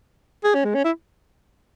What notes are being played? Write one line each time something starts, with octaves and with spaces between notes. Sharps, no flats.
G#4
C#4
G#3
C#4
E4